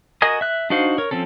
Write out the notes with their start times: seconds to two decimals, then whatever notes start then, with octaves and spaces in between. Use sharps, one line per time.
0.22 F#4 A#4 D#5 G#5 D#6
0.41 E5 F#6
0.70 D4 D#4 F#4 C5 F5
0.98 A#4 C#5
1.11 F3 C4 C#4 A4